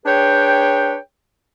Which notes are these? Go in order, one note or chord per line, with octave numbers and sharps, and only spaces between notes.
D4 G#4 B4 C#5 G5